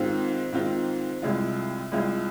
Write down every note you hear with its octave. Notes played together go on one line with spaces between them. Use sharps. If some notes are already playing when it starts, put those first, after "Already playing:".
Already playing: G#2 D#3 C4 F4
G#2 D#3 C4 F4
C2 C3 G#3 F4
C2 C3 G#3 F4